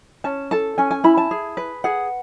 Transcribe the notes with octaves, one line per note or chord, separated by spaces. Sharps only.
C#4 A5
A4 A5
C#4 G#5
G#5
E4 B5
A5
G#4
B4
G#4 F#5